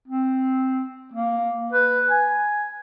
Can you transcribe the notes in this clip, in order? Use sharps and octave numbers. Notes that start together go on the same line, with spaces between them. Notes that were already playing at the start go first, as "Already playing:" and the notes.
C4
A#3
B4
G#5